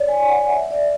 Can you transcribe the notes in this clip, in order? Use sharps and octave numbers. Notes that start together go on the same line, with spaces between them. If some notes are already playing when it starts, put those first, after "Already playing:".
Already playing: C#5 D5
G#5
F#5
E5
D5